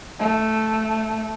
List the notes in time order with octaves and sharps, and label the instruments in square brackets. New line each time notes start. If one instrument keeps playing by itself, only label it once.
[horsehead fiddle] A3